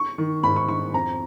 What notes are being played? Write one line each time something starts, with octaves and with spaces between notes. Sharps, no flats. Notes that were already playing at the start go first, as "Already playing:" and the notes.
Already playing: C#6
D#3
G#2 B5
C#6
D#3 C#6
F2 A#5